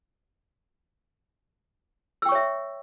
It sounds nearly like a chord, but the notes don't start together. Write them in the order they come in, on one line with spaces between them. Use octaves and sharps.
E6 G5 C#6 C#5 E5